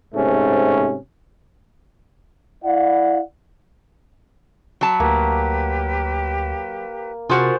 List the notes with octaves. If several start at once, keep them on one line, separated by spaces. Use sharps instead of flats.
G#2 C3 A3 C#4
E4 D5 F5 F#5
F#3 A5 B5
D2 A#3 G4 B4
C3 F4 F#4 G#4 A#4 C5